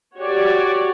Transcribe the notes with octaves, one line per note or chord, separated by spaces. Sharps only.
F#4 G4 C#5 D5